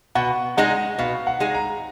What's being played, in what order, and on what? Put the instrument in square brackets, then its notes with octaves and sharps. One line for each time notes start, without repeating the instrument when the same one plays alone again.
[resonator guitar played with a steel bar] B2 [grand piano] F#5
[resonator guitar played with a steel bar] G#3 D#4 G#4 [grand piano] F#5
[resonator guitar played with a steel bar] B2 [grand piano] F5
[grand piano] F#5
[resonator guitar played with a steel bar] G#3 D#4 G#4
[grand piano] A#5